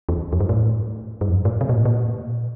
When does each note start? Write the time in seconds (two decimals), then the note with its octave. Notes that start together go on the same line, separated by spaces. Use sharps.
0.09 E2
0.33 F2
0.40 G2
0.49 A2
1.21 G2
1.29 F2
1.37 G2
1.45 A2
1.61 C3
1.69 A#2
1.77 A2
1.85 A#2